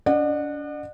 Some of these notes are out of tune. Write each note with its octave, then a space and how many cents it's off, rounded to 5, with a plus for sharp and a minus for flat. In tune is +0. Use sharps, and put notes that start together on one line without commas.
D4 -40 D5 +45 F#5 -10